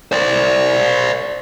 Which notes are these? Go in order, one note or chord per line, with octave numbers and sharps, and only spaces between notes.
C5 D5